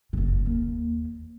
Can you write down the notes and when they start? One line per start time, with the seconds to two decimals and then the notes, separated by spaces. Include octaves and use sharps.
0.13 F#1 C#3
0.45 D#2 A#3